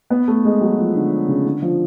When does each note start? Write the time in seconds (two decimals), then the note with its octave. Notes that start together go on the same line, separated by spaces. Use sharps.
0.10 B3
0.28 A3
0.45 G#3
0.61 F#3
0.79 F3
0.95 D3
1.28 C#3
1.45 D3
1.62 F3